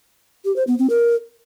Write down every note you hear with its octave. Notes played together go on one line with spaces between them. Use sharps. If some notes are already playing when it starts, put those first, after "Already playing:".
G4
C5
B3
C4
A#4